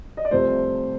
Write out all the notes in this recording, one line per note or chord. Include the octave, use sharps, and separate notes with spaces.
D#5
D5
C2 C3 F3 A3 C5